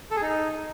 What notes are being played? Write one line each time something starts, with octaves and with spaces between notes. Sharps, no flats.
A4
G#4
D#4